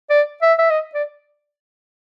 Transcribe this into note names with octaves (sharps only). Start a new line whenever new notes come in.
D5
E5
E5
D#5
D5